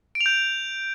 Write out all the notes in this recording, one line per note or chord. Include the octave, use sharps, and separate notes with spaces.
D7
F7
G6